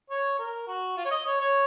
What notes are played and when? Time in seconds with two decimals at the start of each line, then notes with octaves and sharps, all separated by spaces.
0.10 C#5
0.39 A#4
0.67 F#4
0.97 F4
1.05 C#5
1.11 D#5
1.26 C#5
1.40 C#5